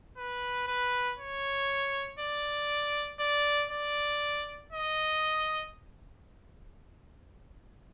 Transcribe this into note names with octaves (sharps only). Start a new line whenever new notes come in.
B4
B4
C#5
D5
D5
D5
D#5